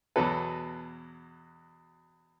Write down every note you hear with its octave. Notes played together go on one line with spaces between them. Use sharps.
E2 B2 F#3 A4 B4